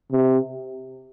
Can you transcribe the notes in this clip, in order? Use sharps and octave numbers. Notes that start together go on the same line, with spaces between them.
C3